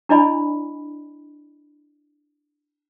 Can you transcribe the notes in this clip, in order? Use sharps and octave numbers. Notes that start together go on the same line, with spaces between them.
D4 E4 D5 D#5 G#5 B5